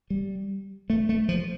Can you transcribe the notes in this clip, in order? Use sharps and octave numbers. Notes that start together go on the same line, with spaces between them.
G3
A3
A3
F3